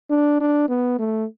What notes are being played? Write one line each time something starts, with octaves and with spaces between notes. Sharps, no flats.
D4
D4
B3
A3